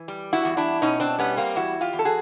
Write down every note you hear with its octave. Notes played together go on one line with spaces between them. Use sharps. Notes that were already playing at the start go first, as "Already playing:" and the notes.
Already playing: E3
G3
E4 F#4
E2
D4 E4
B2 C#4 D#4
C4 D4
G3 B3 C#4
A#3 C4
E2 E4 F#4
F4 G4
E2
A4
F#4 G#4